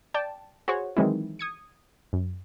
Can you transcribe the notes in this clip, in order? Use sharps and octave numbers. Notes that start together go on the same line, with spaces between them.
D5 G5 A5
F#4 G#4 C5 C#5
D#3 E3 F#3 G#3 C4 E4
D#6 G#6 C#7
F#2